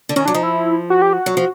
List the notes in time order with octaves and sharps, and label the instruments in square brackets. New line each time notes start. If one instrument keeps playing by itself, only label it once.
[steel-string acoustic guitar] D3
[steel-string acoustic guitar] D#3 [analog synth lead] C#4
[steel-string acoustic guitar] F#3 [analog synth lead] D4
[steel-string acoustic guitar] F3 [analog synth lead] D#4
[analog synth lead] E4
F#4
G4
F#4
[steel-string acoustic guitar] F#3
F3